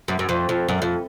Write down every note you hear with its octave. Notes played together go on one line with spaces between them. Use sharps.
F#2
F#2
F2
F2
F#2
F2